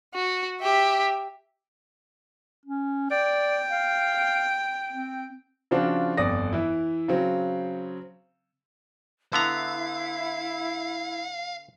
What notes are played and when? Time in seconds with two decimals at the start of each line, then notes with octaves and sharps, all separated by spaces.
0.14 F#4
0.62 G4 E5
2.66 C#4
3.11 D5 G5
3.71 F5
4.90 C4
5.71 C#3 F3 C4 D4 F4 F#4
6.17 G1 F2 D5 D#6 A#6
6.53 E3 E4
7.08 C#3 F#3 C4
9.33 D3 B3 E4 F5 A#5